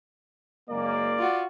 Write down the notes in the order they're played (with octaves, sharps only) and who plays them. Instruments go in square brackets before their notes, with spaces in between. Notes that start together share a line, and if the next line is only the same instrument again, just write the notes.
[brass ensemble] F#1 G#3 A#3 [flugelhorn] D5
[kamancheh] F4 F#4